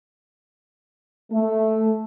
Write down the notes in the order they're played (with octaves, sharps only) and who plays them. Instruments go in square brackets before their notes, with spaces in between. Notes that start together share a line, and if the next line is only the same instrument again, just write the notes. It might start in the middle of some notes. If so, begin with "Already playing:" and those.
[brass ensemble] A3